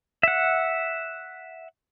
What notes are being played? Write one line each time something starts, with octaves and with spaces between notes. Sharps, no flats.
E5 F#5